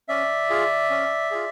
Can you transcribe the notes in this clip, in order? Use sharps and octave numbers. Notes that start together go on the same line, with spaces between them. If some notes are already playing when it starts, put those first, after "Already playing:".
C#4 D5 E5
F4 G#4
C#4
F4 G#4